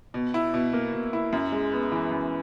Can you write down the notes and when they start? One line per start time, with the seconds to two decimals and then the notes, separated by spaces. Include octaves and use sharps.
0.14 B2
0.34 E4
0.54 B2
0.73 A#3
0.93 B2
1.13 E4
1.33 F#2
1.52 G#3
1.72 B3
1.92 E3
2.11 F#2